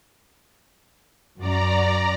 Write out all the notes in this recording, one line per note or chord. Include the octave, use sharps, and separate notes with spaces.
F#2 F#4 D5 A#5